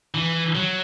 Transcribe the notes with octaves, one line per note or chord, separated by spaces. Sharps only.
E3
F#3